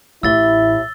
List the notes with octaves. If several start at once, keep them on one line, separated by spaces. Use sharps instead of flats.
A1 A2 E4 G4 E5 E6 A6 G7